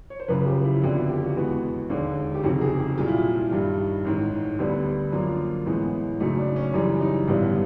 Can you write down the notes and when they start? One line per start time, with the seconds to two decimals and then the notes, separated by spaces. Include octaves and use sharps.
0.10 C#5
0.20 C5
0.28 F#1 F#2 C#3 F3 B4
0.46 G4
0.64 E4
0.76 F4
0.82 F2 D3 F#3 B3 E4
0.96 F4
1.09 G4
1.23 F#4
1.36 E2 B2 G#3 B3
1.90 E1 D#2 D3
2.34 G4
2.43 F#1 F2 C3 D#3 F#4
2.61 G#4
2.79 G4
2.97 C2 A#2 F#3 F4
3.08 E4
3.19 F4
3.51 G2 D#3 G3
4.05 A1 G#2 D#3
4.59 D2 D3 G3 B3
5.13 F#2 D3 F3 A#3 F4
5.66 A1 A2 E3 G#3 B3
6.20 F#2 C#3 F#3 A3 D#4
6.38 D4
6.56 C#4
6.74 F#2 C#3 E3 G3 D4
7.01 D#4
7.28 A1 G2 D3 G3 B3 E4